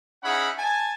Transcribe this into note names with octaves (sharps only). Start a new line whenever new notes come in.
C#4 D#4 E4 G#4 F#5 B5
G#5 A5